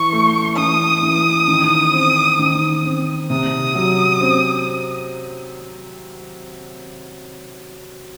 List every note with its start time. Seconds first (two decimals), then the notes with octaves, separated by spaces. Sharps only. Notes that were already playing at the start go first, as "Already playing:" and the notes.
Already playing: E3 C#6
0.12 A3
0.57 E3 D#6
1.03 E3
1.48 D#3
1.93 C4
2.39 D#3
2.85 C4
3.30 C3 D#6
3.75 F#3
4.21 C4